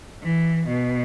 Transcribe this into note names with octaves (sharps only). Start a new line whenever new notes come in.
E3
B2